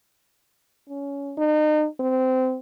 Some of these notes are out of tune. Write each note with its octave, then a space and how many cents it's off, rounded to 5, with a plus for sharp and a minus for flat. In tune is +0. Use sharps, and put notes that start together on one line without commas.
C#4 +20
D#4 -35
C4 -20